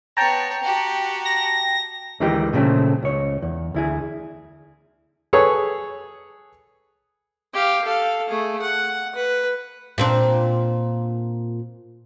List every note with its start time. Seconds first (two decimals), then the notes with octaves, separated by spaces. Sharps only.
0.17 B3 C#5 G5 A5 A#5
0.63 F#4 G4
1.25 A#6
2.20 D2 D#3 E3 G#3 D#4 G4
2.53 A#2 C#3 F3 A3 C4
3.03 C#2 C#5
3.42 E2
3.74 D2 E4 G#4
5.33 G#4 A4 B4 C#5
7.53 G4 F5
7.84 A4 F5
8.28 A3 G#4
8.61 F#5
9.15 B4
9.98 A#2 C4 D4